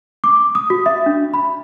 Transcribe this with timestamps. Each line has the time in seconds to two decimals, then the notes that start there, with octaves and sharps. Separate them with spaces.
0.24 D6
0.55 D#6
0.70 F#4
0.86 E5
1.06 D4
1.34 B5